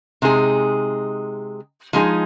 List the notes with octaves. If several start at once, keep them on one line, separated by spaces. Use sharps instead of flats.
C3 G#3 D#4 G#4
F3 G#3 D#4 G#4